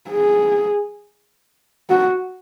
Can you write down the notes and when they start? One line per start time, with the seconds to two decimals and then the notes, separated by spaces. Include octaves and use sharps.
0.10 G#4
1.90 F#4